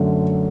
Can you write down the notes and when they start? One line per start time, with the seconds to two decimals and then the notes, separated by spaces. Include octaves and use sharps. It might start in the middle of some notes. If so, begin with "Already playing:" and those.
Already playing: F#2 D3 A3